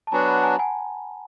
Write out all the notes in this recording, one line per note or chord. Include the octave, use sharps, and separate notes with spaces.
A5
F#3 B3 D4 F#4 G#5 A#5
A5 B5
G#5 A#5
F#5 G#5